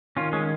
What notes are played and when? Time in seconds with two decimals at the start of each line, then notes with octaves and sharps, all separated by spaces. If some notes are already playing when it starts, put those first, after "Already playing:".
0.17 D#3 C#4 F4
0.33 G#3 C#4